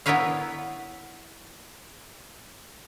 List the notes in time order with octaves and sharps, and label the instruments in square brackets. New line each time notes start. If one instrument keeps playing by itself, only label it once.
[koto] B3 E4 A#4 B4 C#5 F5